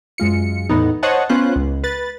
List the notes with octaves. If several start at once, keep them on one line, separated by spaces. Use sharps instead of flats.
F#2 G#3 F4 C#7
E2 A2 B3 D#4
C5 C#5 D#5 F#5 A5
B3 C#4 F4 C5 F#6
C#2
B4 A6